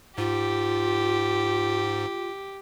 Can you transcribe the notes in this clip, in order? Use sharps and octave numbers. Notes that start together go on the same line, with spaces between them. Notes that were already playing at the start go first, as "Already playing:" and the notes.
G#2 F4 G4